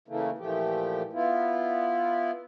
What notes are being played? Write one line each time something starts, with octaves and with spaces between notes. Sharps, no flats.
C#3 E3 A3 A#3
A#2 E3 F3 A3 G4
B3 E4 F4